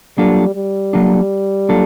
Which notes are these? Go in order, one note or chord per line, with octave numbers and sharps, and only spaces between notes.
F#3 G3 A#3 D4 F4 A4
G3
F#3 A#3 D4 F4 A4
F#3 A#3 D4 F4 A4